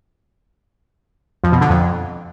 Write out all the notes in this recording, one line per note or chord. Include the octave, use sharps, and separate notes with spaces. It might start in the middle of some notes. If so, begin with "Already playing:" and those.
F2
B2
D3
F2